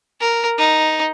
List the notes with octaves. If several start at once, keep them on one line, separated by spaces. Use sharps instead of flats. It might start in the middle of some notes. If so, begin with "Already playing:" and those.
A#4
D#4